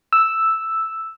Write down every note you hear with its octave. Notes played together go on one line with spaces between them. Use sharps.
E6